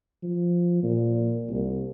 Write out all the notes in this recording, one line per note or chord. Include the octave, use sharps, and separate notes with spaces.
F3
A#2
C2